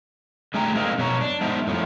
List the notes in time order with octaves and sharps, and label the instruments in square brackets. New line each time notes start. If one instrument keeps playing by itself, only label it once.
[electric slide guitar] D3 A3 G#4 G5 A#5
G#3 A#3 C4 D#4
F#2 B2 C#5 A#5
D4
G#3 B3 D4 D#4 C5 E5
F#2 A2 F3